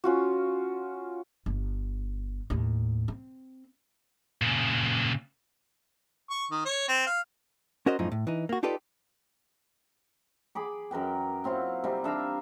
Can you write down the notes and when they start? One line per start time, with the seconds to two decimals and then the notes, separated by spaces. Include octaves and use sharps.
0.04 C#4 F4 F#4
1.46 G1
2.50 D#2 A2
3.08 C4
4.42 A#2 C#3
6.30 C#6
6.51 D#3
6.66 C#5
6.88 C4
7.07 F5
7.86 C#4 F#4 A#4 C5 D#5
7.99 F#2 A2 F3 D#4
8.12 A2
8.27 E3 D#4
8.49 A#3 F#4
8.63 D#4 F4 G4 A4 B4 D5
10.55 G#4 B5 D6
10.91 F#2 A#4 B4 G5
11.44 F#3 C4 E4 F4
11.84 C3 G3 D#4
12.04 D4 E5 F5 A#5